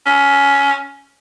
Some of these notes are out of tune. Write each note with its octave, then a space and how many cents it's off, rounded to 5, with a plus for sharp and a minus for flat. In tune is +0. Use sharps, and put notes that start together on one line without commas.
C#4 +15